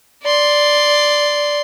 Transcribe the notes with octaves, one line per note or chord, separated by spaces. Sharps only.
D5 C6